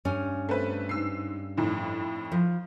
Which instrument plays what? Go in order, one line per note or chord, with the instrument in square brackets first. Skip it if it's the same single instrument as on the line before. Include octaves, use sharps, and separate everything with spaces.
[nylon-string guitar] G2 C#4 G#5
[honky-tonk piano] A3 C4 B4
G#2 E6 C7
F2 A2 D#3
[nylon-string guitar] F3